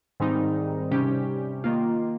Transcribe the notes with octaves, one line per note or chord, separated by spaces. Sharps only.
G#2 D#3 G3 C4 D#4
C3 G3 C#4 G4
D#3 A#3 F4